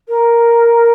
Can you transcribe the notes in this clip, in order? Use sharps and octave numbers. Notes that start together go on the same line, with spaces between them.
A#4